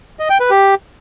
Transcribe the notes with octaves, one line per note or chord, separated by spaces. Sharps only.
D#5
G5
B4
G4